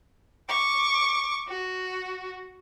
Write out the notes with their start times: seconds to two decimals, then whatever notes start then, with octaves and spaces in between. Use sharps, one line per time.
0.49 C#6 D6
1.48 F#4